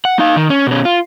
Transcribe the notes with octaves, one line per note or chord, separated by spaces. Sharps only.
F#5
D#4 F5
D#3
C#4
B2 C#4
F4